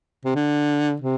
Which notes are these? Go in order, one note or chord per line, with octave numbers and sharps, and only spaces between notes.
C3
D3
C3